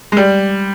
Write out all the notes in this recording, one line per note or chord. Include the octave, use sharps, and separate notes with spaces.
G#3
G3